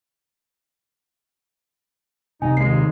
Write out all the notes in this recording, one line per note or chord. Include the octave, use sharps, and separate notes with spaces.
C3 G3 D#4 G#5
D#2 G#3 C7